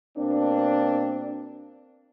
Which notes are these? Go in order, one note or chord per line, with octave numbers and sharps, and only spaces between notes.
B2 A#3 C4 D4